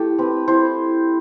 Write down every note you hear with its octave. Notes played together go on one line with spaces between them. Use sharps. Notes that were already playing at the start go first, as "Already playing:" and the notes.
Already playing: A3 E4 G4
C4 B4
E4 C5